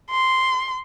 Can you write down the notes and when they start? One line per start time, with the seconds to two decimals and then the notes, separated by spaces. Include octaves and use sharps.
0.10 C6